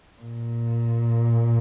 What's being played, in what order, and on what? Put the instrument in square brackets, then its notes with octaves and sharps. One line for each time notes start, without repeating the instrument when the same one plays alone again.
[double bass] A#2